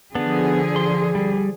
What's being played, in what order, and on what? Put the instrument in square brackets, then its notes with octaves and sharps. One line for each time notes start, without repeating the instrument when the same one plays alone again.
[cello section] D3 F3 G#4 [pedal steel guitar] B3 D4
[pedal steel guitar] C6
G3